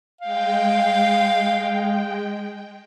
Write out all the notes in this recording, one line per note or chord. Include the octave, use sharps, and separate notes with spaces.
G#3 F5 G5